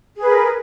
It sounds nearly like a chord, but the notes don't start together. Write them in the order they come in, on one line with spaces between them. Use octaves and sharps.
G#4 B4 A#4